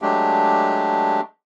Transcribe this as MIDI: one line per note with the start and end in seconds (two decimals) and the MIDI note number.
0.02 1.21 54
0.02 1.21 56
0.02 1.21 57
0.02 1.21 62
0.02 1.21 67